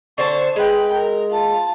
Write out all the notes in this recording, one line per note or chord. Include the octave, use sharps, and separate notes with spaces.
D3 C5 A5 C#6
G#3 B4 G5
A#4
F4 A5